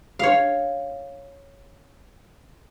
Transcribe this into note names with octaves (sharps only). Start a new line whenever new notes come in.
C#5 F5